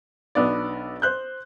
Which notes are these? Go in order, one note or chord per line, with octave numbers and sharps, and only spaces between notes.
B1 B3 D4 D5
C5 F#6 G6